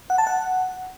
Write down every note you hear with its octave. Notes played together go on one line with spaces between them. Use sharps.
F#5
A5
F#5